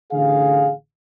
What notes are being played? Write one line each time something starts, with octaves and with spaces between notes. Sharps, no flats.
A1 D3 G#4 F5